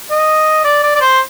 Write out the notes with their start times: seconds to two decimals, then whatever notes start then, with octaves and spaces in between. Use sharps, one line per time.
0.11 D#5
0.64 D5
0.83 D5
0.95 D5
1.01 C5